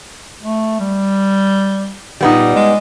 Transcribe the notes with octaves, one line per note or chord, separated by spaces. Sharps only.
A3
G3
A#2 G3 B3 D#4
G#3